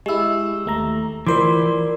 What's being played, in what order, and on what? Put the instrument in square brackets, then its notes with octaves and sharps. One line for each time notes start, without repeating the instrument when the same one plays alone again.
[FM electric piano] G#3 E4 [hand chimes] G4 E6
[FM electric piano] D#2 A3 A#5
[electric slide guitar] E3 [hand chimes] F4 A#4 D5 [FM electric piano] C5 C6 D6